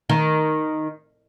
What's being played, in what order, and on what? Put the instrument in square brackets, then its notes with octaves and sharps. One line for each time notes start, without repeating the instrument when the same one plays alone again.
[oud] D#3